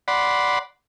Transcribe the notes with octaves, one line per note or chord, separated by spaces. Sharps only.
D5 F#5 B5 C6